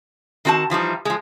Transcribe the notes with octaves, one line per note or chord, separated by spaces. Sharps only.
D#3 C4 F#4 G#5 A5
E3 F3 G3 D#4
F3 G#3